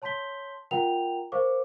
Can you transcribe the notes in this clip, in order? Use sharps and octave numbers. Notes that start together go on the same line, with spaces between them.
C#5 A5 C6 G6 B6 G7
F4 A#4 F#5 G5 A#5 F7
A#4 C5 F5 C#6 D6